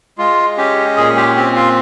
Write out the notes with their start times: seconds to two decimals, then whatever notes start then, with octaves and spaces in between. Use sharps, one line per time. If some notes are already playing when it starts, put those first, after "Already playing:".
0.18 G#3 F4
0.58 C#4 G4
0.97 A#2 G#4
1.16 G4
1.36 C4 G4
1.55 F4